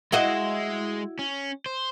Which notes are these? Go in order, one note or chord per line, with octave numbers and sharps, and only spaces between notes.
G#3 E4 F#4 D#5
C#4
C5